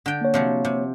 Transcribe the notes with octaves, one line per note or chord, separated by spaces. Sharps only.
D3 G5
A#3 C#5
C3 F3 F#3
C3